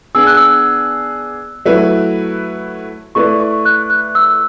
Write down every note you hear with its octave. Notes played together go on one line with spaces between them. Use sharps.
B3 D4 G#4 E6
F#6
E6
F#3 A3 E4 B4
A3 E4 B4 D5 C#6
C#6
F#6
F#6
E6